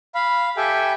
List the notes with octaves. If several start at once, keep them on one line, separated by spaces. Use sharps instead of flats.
F5 B5
G4 A4 E5 G5 G#5